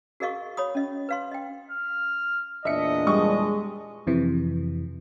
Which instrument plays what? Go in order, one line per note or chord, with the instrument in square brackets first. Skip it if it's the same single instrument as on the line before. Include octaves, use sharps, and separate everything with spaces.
[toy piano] F#4 G#4 A#4 D#5 F5 C#6
C#5 B5 D#6
C#4 D#5
B4 F5 C6
D#5 G5
[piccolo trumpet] F6
[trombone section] E2 A#2 D4 [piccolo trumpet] D#5 [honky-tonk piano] E5 C#7
[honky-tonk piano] G3 C#6 D#6 [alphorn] G#3
[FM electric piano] F2 C3 E3